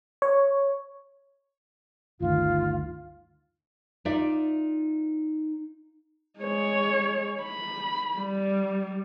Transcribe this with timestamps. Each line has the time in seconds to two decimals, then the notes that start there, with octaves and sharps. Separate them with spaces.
0.22 C#5
2.20 G1 D2 D#3 F4
4.05 D#4 F4 D5 E5
6.40 G#3 C#5
7.41 B5
8.16 G3